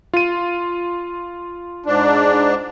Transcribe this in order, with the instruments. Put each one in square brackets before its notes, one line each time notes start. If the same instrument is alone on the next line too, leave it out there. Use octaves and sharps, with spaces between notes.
[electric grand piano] F4 D#7
[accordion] G#2 D4